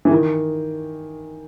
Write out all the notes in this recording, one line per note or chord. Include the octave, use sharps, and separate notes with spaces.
E3
D#3